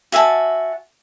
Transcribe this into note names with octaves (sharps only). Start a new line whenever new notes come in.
F#4 E5 G#5 A5